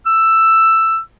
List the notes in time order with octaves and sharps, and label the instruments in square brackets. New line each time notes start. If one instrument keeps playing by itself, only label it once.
[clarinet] E6